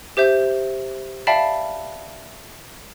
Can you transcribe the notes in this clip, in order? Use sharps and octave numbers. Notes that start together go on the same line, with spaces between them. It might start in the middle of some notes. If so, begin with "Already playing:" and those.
G4 C5 E5 G6
D5 E5 F5 G5 A5 B5